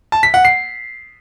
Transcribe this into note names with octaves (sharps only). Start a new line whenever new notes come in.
A5
B6
F#5
C7